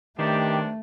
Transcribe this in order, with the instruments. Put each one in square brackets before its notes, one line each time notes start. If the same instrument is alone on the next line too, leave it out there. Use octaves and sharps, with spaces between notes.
[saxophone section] G2 C3 D4 [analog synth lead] D#3 [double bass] A3 [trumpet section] G4